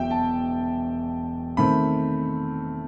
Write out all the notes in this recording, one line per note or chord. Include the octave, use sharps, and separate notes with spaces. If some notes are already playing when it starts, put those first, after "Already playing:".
Already playing: E1 E2 F#3 E5 G5
A5
D#3 A3 C4 B5